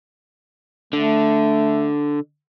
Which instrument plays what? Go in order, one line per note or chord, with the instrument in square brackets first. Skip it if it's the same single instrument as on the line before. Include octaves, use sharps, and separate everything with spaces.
[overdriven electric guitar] D3 [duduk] A3